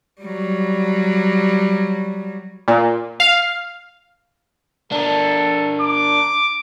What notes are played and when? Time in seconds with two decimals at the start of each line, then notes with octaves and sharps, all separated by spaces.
0.21 F#3 G3
2.68 A#2
3.20 F5
4.92 D4 A4 A#4
5.81 D6